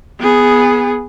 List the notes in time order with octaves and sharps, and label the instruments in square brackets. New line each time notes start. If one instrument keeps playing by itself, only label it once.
[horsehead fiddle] B3 G#4